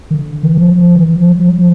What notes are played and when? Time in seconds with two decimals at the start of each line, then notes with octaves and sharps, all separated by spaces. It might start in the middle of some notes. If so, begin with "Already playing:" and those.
0.11 D#3
0.15 D3
0.43 E3
0.57 F3
0.72 F3
0.95 D#3
1.02 E3
1.16 F3
1.30 F#3
1.39 F3
1.49 F#3
1.58 F3